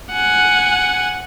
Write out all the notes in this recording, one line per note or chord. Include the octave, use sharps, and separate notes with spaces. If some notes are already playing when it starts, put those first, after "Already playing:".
F#5 G#5